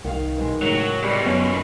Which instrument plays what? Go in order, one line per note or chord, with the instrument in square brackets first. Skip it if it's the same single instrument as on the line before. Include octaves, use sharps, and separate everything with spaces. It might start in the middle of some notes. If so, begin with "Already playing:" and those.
[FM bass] C2 [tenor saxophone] D#3 [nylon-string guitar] F5 F#5
[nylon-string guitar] B2 E3 G#3
[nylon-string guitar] A2 C#3 A#4 [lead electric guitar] F#3 [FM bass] G#3
[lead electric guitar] C#2 B2 [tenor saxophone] G3
[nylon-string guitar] F#2 [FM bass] B3 [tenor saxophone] C#4